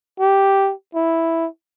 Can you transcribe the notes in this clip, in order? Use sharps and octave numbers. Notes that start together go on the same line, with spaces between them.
G4
E4